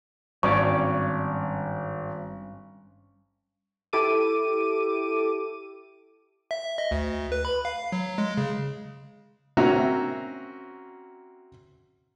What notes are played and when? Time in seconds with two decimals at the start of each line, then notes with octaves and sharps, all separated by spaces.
0.43 G#1 G2 C#4 D5 C#6
3.93 E4 G4 A4 D6 D#7
6.51 E5
6.78 D#5
6.91 D2
7.07 D2
7.32 B4
7.45 B5
7.65 F5
7.92 F#3
8.18 G#3
8.37 C#3
9.57 A#3 C4 C#4 F#4 E5 A#5